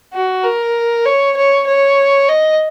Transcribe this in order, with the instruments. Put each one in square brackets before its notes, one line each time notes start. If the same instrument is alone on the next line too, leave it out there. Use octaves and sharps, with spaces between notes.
[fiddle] F#4
A#4
C#5
C#5
C#5
D#5